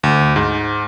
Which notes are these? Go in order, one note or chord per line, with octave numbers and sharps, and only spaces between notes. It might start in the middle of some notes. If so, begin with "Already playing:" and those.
D2
G#2